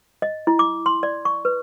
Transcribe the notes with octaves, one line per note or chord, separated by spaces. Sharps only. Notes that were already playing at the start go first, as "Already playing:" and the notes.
D#5
E4
D6
C6
D5
C#6
B4